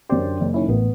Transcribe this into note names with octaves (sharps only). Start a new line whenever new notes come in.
F#2 D3 C#4 G4 C5 D5
F#1
D#3 C#4 E4
A1 B3